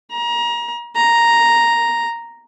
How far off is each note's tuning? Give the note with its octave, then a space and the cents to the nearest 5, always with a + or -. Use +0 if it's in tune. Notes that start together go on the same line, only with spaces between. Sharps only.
A#5 +30
A#5 +0